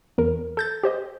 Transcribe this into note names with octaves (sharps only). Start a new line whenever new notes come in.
E2 A#4
A4 G6 A6
G4 C5 D#5